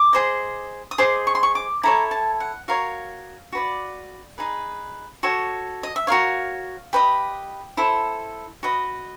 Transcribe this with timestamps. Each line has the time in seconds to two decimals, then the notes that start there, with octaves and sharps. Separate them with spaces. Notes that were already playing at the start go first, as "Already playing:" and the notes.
Already playing: D6
0.13 G#4 C5 D#5
0.91 D#6
0.98 G#4 C5 D#5 D6
1.27 C#6
1.35 C6
1.43 C#6
1.55 D6
1.83 E4 A4 C#5 A#5
2.11 A5
2.40 F#5
2.68 F#4 A#4 C#5 F5
3.52 F#4 B4 D5
4.38 D#4 G#4 B4
5.23 F#4 A4 C#5
5.83 D#5
5.96 E5
6.07 F#4 A#4 C#5 F5
6.93 G4 B4 D#5
7.77 E4 A4 C5
8.63 F#4 B4 D#5